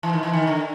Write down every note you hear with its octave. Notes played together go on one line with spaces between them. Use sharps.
E3
D#3
E3
D#3
D3